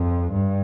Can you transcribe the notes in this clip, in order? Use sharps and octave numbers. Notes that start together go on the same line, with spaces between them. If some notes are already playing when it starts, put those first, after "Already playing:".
Already playing: F2
G2